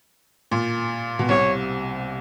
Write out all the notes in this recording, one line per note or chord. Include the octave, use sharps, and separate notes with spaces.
A#2
B2
C2 C3 C#5